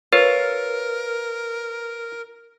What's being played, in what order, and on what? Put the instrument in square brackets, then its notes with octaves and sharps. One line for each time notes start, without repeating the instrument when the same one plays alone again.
[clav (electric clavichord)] F4 [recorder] A#4 [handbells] B4 [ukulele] C#5